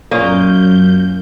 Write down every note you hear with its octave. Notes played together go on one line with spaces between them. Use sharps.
F#2 A#2 A#3 C#4 D#5 G6